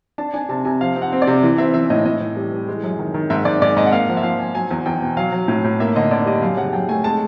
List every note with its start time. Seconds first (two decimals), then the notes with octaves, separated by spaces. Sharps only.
0.18 D4 A5
0.34 D4 G#5
0.49 C3 A5
0.65 C3 G#5
0.81 F3 F5
0.96 C4
1.02 F#5
1.12 C4
1.22 D5
1.27 C3
1.43 E3
1.58 C4 E5
1.74 E3 E5
1.90 A2 D#5
2.05 A2 D#5
2.21 E3
2.37 G3
2.53 E3
2.68 G#3
2.83 F#2
2.99 D#3
3.14 D#3
3.30 G#2 E5
3.45 G#2 D5
3.62 G#2 D5
3.77 G#2 D#5
3.86 F#5
3.92 A#3 F5
4.08 F3 F#5
4.17 E5
4.23 F3 F5
4.40 F3 G#5
4.54 F#3 G#5
4.71 E2
4.86 E2 G5
5.02 B2
5.17 F#3 F5
5.32 F#3
5.48 A2
5.64 A2
5.80 A#3 E5
5.96 D3 D#5
6.11 D3 D5
6.26 G3 D#5
6.42 F#2 F5
6.57 C#3 F#5
6.73 F#2 G5
6.89 A3 G#5
7.04 G#3 A5